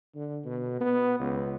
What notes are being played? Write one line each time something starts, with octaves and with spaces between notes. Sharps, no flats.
D3
B2
B3
C#2